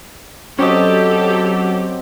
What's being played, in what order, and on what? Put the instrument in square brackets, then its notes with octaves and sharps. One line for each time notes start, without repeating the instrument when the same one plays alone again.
[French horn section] F#3 [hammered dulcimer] C4 F#4 D#5 [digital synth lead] C#4 [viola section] G4 A4